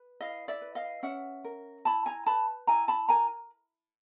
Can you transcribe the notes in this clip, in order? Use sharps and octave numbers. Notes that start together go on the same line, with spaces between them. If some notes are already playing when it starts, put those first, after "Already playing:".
Already playing: B4
E4 D#5 F5
D5 E5
B4
D#5 F5
C#4 E5 F#5
A#4
E4 A5 B5
G#5 A#5
B4 A5 B5
E4 G#5 A#5
A5 B5
A#4 G#5 A#5